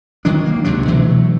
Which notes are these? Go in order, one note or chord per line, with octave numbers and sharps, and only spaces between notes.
D#3 F#3 G#3 D4
A#3
C#2 C3 F#3 D4
B2 E3 F#3 A3